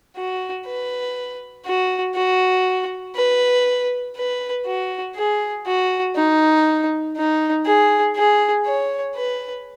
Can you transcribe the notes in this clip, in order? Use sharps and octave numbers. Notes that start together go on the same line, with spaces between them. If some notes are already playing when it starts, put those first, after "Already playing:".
F#4
B4
F#4
F#4
B4
B4
F#4
G#4
F#4
D#4
D#4
G#4
G#4
C#5
B4